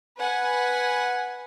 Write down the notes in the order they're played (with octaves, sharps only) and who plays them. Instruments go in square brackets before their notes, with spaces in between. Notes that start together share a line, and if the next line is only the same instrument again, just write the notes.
[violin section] B4 F#5 G#5